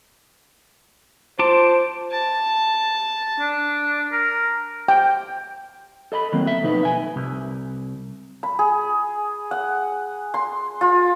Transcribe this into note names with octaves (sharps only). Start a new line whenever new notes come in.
F4 C5 A5 D6
A5
D4
A#4
G5
A4 D#5 A#5 B5
D#3 F#3 A#3 C4
A4 E5
F2 B2 D#4 B4
E5 G#5
C2
B5
G#4
F#5
C6
F4